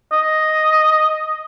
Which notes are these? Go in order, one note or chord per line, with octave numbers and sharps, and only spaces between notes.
D#5